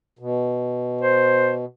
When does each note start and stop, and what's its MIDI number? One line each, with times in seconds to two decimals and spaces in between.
0.19 1.65 47
1.01 1.53 72